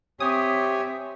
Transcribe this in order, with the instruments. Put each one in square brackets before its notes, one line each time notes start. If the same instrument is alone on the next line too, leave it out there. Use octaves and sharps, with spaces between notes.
[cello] C4 E5 [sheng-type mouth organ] G4 C#5 G#5 [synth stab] D#6